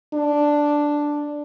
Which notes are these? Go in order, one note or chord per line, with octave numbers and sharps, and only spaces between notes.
D4